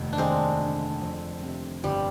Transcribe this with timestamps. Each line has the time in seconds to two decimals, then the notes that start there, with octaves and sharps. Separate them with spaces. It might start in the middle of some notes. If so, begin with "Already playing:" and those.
Already playing: F1 D#2
0.13 D4
0.18 D#2 G#3 C4
0.60 D3
1.01 F2
1.43 C3
1.84 G1 G3